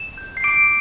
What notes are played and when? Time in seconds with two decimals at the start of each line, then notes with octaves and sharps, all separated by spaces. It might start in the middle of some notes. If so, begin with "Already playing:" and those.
Already playing: E7
0.18 G6
0.37 C7
0.44 D6 D7